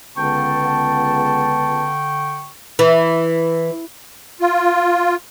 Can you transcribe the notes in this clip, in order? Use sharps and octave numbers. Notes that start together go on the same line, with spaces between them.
C#2 D3 B3 G5 A5 C#6
E3
F4